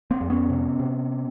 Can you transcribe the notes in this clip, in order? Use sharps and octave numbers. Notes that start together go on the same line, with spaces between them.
A#3 C4
F2
B3 C#4
C3
C3